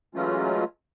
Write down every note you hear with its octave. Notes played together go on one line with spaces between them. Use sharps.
E3 F#3 G#3 A3 C#4 F4